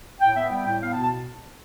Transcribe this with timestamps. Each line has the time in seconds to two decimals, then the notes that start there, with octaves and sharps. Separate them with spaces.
0.21 A2 G5
0.36 B3 E5
0.52 G3 G5
0.66 A2 G5
0.82 B3 F5
0.93 A5
0.97 B2
1.03 A5